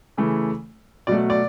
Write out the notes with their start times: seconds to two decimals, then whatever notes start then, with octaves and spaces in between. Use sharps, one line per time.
0.17 C#3 E3 A3
1.07 B2 F#3 A3 D5
1.30 D5